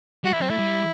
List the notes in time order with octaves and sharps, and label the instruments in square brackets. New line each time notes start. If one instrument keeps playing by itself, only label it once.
[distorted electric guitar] G3 [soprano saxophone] F#4
[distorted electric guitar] E3 [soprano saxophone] E4
[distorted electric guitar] F#3 [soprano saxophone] C4
[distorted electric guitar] A3 [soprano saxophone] E4
[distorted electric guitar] G3